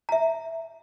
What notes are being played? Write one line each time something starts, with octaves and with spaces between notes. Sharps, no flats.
E5 A#5